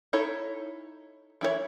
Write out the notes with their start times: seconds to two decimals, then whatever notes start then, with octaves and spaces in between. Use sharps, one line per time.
0.13 D#4 E4 A4 C#5
1.41 E3 E4 G#4 C#5